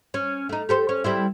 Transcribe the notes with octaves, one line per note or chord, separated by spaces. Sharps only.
C#4
A3 D#4
G4 A4 C5
C#4
G3 C4 E4